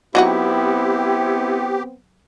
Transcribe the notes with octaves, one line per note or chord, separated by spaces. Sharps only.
F#3 B3 C4 D#4 E4 F#4 G4